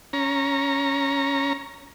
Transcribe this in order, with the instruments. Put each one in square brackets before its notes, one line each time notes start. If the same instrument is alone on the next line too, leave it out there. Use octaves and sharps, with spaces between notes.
[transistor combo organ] C#4 A#5